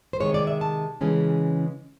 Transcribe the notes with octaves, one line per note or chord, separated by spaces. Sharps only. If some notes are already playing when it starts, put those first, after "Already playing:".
C5
C3 D#3 G#3 C#5
D5
E5
A5
C#3 E3 G#3 C#4